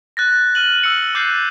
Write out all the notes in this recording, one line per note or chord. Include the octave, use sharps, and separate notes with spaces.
F#6 A6 A#6
F6 D#7 F#7
E6 C#7
D6 F#6 G6 A6 C7